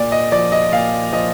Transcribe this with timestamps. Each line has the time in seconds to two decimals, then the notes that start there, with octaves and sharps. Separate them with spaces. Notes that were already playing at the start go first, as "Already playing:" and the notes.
Already playing: A#2 D5
0.12 D#5
0.32 F3 D5
0.52 D#5
0.72 A#2 F5
1.12 F3 D#5